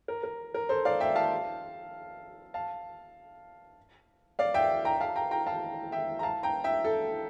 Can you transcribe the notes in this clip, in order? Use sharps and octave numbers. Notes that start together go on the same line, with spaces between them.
A#4
A#4
A#4
A4 C5
D5 F5
E5 G5
F5 A5
F5 A5
D5 F5
E5 G5
G5 A#5
F5 A5
G5 A#5
G5 A#5
F5 A5
E5 G5
A#5
F5 A5
G5 A#5
E5 G5
A4